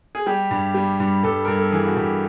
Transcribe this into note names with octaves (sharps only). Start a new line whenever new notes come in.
G#4
G3 G4
G2
G3
G2
G2 A4
G2 A#4
A4
E3 G#4
F#4
G2 G4